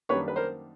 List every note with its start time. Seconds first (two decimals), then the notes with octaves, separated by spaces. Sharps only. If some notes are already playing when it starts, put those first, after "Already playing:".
0.09 F#2 D#3 G3 A#3 D4 B4 C#5
0.28 B4
0.36 A#4 C5